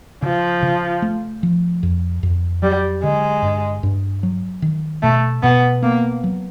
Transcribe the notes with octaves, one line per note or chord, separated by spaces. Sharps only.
C#3 F3
C#3
A3
F3
F2
F2
F#3 G3
D3 G#3
G2
G2
F#3
D#3
B2 A3
B2 B3
A#3 B3
F#3